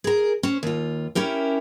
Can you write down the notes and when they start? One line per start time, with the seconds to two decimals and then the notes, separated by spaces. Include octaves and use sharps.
0.04 G#4 A#4
0.43 C#4 C5
0.63 D#2 F4
1.15 C#4 E4 G4 A#4